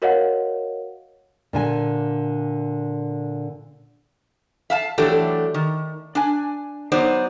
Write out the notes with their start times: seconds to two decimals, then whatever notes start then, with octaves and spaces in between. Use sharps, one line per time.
0.02 F#4 A#4 C#5 D#5 F5 F#5
1.53 A#2 D3 G#5
4.70 E5 F5 A5
4.98 E3 F#3 A3 D4 G4 A4
5.54 D#3
6.15 D4 G#5
6.92 F#3 B3 D#4 C5 D5